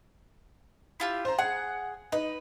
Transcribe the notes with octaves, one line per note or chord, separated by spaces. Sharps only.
E4 F4 G4
C5 A#5
G#4 F#5
D#4 B4